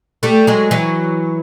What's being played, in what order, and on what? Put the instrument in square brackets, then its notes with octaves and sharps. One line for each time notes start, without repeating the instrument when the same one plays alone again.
[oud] G3 A3
F#3 G#3
E3 F#3